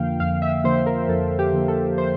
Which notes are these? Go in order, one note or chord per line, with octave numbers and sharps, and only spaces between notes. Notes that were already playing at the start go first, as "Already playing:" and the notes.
Already playing: F2 D3 F3 A#3 F5 G5
F2 F5
E5
D3 F3 A#3 C5
A#4
F2 A4
G4
D3 F3 A#3
A4
C5